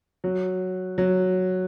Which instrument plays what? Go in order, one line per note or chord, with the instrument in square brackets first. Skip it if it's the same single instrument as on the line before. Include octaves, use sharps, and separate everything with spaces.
[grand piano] F#3
F#3